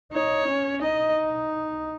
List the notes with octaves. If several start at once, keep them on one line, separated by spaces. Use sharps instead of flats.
D#4 C#5
C#4
D#4 D#5